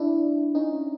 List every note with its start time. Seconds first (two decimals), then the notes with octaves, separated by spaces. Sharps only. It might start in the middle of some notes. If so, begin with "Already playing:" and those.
Already playing: D4 E4
0.55 C#4 D#4